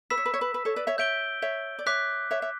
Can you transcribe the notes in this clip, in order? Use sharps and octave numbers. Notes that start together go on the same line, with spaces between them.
B4 E6 B6 E7
C#5
B4
C#5
B4
B4
A4 C#5
B4 D5
C#5 E5
C#5 E5 G6 D7 G7
C#5 E5
D5
C#5 E5 D6 F#6 B6
C#5 E5
C#5 E5